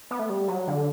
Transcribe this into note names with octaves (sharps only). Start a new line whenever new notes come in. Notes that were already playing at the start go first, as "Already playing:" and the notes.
B3
A3
G3
F#3
D3